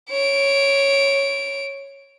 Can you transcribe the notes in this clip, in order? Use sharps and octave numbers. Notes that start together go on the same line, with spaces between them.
C#5 D7